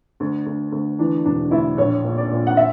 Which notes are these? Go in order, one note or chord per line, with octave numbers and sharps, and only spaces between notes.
D2
D2
D2
E3 D4
E1 D4
D2 E4
A#1 C#5
A#2
D5
A#2
F#5
E5